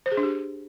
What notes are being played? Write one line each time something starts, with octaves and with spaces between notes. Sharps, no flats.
C5
G#4
D4
G4